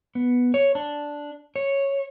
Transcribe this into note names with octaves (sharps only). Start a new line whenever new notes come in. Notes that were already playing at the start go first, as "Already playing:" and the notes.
B3
C#5
D4
C#5